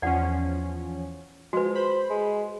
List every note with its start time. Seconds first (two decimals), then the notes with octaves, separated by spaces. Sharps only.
0.02 E2 F3 C#4 D5 F#5
1.53 F3 G#3 F#4 B4
1.75 C5 B5
2.10 G#3